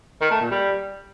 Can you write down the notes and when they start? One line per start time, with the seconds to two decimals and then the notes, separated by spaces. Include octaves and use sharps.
0.21 D#3
0.31 A3
0.41 A#2
0.51 G3